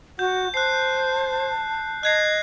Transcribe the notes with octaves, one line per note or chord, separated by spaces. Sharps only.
F#4 F#5 G6
C5 A5 F#6 C7
D#5 F#6 G#6 C7